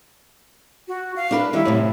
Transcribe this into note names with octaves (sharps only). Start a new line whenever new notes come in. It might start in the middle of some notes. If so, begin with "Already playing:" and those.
F#4
F5
D4 A#4 B4
D#3 G3 E4
F#2 A2 C3